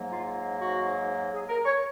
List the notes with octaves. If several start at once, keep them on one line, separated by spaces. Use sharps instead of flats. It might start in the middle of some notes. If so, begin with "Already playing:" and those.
Already playing: G#2 F#3 A#3
F4
F#4
G#4
A#4
C#5